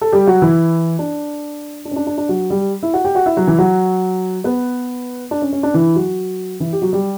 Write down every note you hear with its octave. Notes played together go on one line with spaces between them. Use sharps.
A4
G3 G4
F#3 F#4
E3 E4
D4
D4
C#4
D4
D4
D4
F#3 F#4
G3 G4
E4 E5
F#4 F#5
G4 G5
F#4 F#5
E4 E5
F#3 F#4
E3 E4
F#3 F#4
B3 B4
D4
C#4
C#4
D4
E3 E4
F#3 F#4
E3 E4
G4
F#3 F#4
G3 G4